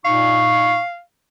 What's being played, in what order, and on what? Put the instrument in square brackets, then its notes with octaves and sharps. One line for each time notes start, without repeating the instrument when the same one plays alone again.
[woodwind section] A#2 D#4 C#6 [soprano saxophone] F5